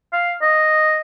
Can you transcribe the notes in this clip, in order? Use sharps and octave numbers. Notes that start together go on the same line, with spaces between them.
F5
D#5